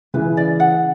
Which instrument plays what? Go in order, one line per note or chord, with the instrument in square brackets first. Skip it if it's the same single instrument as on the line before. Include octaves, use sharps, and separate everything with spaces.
[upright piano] C#3 E3 [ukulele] B4
[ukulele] D5
F#5